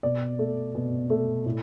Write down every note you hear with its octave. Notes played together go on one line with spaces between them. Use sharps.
B2 D5
A3
B2
A3
A2